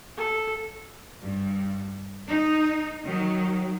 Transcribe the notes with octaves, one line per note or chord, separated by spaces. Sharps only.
A4
G2
D#4
D#3 F#3